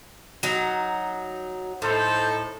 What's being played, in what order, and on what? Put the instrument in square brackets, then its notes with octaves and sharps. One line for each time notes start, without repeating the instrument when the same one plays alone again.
[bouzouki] F#3 D#4
[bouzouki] A2 [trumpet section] D#4 A4 C5